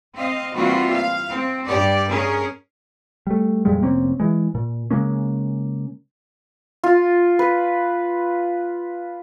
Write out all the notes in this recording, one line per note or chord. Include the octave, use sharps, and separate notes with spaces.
C4 D#5 F5
E3 G3 A#3 C4 F4 F#4
F5
C4
G2 G4 D5
C#4 G#4 A#4
G3 A3
F2 A#2 G3 G#3
F1 A#3 C4 C#4
E3 G#3
A#2
C#3 G#3 A#3 C#4
F4
B4